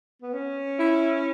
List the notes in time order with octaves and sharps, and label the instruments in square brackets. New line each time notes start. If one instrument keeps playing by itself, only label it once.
[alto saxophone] B3
C#4
[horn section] E4